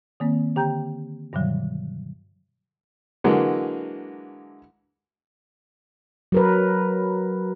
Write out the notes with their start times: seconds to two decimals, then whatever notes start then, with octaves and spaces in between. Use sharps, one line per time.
0.20 D#3 A#3 C4
0.56 D3 G4 G5 A#5 G6
1.33 G2 B2 D3 D#3 F#3 G3
3.24 D3 E3 F#3 G#3 A#3
6.32 F#3 A#4 B4